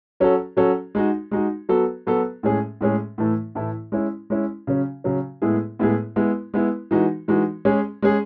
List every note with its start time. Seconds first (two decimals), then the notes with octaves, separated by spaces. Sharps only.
0.20 F#3 C#4 F#4 A4
0.57 F#3 C#4 F#4 A4
0.95 G#3 D#4 F#4
1.31 G#3 D#4 F#4
1.69 F#3 B3 F#4 A4
2.07 F#3 B3 F#4 A4
2.43 A2 G#3 C#4 G#4
2.81 A2 G#3 C#4 G#4
3.18 A2 E3 A3 E4
3.55 A2 E3 A3 E4
3.92 G#3 C#4 E4
4.30 G#3 C#4 E4
4.67 C#3 F#3 C#4
5.04 C#3 F#3 C#4
5.42 A2 G#3 B3 E4 G#4
5.79 A2 G#3 B3 E4 G#4
6.16 G#3 B3 E4
6.54 G#3 B3 E4
6.91 E3 G#3 D#4 F#4
7.28 E3 G#3 D#4 F#4
7.65 G#3 C#4 G#4
8.02 G#3 C#4 G#4